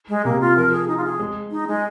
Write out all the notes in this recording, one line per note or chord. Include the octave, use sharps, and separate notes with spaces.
G#3
C3 A#3
F4
F3 A#4
G#4
D#4
F4
G#4
G#3
D#4
G#3